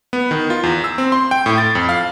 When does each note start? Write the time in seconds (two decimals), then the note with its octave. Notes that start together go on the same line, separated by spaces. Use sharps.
0.13 B3
0.31 D#3
0.50 F4
0.63 E2
0.84 E6
0.98 C4
1.12 C6
1.31 G5
1.46 A2
1.58 A6
1.75 F2
1.89 F5